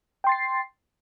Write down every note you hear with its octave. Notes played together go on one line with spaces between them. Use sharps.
G5 C6 A6 C7